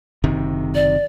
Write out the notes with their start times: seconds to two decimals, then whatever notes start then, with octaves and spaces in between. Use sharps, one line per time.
0.24 F#1 C3 D#3
0.75 D5